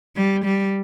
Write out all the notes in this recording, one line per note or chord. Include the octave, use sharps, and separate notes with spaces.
G3
G3